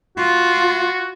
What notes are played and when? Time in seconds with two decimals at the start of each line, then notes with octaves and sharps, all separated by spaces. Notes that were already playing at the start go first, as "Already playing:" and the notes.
0.17 F4 F#4